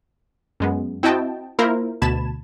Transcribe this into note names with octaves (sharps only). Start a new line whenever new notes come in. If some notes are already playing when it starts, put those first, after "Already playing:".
F#2 G#3 B3
C4 E4 F#4 D#5 G5 A5
A#3 E4 F4 A#4 C5
D2 B2 A5 B5 G#6 E7